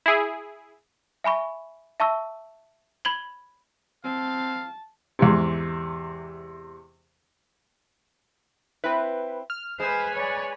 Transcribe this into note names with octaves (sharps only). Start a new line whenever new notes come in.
E4 G#4
E5 G#5 B5 C#6
E5 A5 C#6 E6
B5 G#6 F#7 G7
C4 F5 A5
E2 G#2 C3
C4 E4 B4
F6
G#3 B4 C5 G#5 B5
C#5 D5